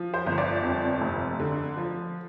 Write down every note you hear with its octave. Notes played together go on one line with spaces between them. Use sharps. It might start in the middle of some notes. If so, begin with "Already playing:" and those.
Already playing: F3
C5
G1
D5
F2
F1
D3
F3